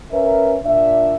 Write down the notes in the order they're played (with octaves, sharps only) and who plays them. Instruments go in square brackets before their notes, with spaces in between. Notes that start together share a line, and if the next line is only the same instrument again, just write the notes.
[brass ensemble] C#4 A#4 B4 E5
A#2 D4 E5